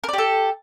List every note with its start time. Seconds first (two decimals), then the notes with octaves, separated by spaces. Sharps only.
0.04 A#4
0.08 D5
0.13 G4
0.18 A4